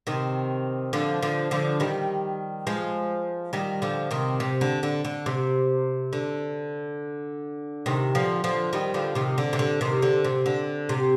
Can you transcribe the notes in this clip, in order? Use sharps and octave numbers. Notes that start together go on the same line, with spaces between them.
C3 D#3
D3 F3
D3 F3
D3 F3
D#3 G3
F3 G#3
D#3 G3
D3 F3
C3 D#3
C3
D3
D3
D3
C3
D3
C3 D#3
D3 F3
D3 F3
D#3 G3
D3 F3
C3 D#3
D3
C3
D3
C3 D#3
D3
C3
D3
C3